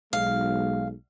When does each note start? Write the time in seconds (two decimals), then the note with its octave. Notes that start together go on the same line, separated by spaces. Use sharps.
0.13 B1 G#3 F5